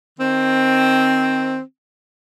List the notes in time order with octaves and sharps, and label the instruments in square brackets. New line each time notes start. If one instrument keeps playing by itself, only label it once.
[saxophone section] D#3 C4